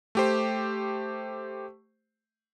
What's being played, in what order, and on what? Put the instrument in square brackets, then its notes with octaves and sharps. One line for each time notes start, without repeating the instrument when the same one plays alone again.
[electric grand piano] A3 G4 C5